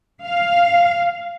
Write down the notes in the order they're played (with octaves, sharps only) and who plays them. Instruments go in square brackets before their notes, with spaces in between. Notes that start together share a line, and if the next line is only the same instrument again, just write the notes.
[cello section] F5